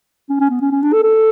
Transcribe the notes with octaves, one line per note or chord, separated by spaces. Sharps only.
C#4
C#4
B3
C#4
C#4
D4
A4
A4